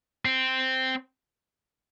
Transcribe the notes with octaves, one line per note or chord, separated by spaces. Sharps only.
C4